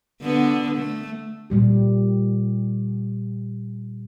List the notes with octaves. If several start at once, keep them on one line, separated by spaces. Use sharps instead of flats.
D3 B3
A3
A#2 G3 G4